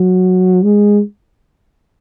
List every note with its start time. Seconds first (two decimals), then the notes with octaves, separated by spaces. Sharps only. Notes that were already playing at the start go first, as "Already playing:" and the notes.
Already playing: F#3
0.64 G#3